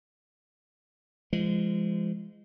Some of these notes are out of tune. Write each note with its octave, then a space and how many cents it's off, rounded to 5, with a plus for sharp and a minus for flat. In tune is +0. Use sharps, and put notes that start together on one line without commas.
F3 -35 G#3 -15